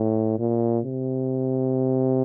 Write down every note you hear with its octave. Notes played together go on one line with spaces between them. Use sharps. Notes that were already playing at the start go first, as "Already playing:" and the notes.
Already playing: A2
A#2
C3